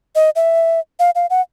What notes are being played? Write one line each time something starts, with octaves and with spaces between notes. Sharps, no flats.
D#5
E5
F5
F5
F#5